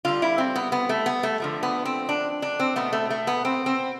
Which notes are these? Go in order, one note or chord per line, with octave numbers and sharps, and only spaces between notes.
D3 G3 F4
E4
C4
B3
B3
A3
B3
A3
D3 F3 A3
B3
C4
D4
D4
C4
B2 A3 B3
A3
A3
B3
C4
C4